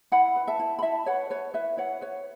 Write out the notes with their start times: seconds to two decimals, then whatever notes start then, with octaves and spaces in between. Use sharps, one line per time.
0.12 E4 F#5 B5
0.36 B4
0.47 E5 A5
0.59 E4
0.79 B5
0.83 E4 E5 A5
1.06 B4 C#5 F#5
1.30 B4 C#5
1.54 E4 B4 E5
1.77 E4 C#5 F#5
2.01 B4 C#5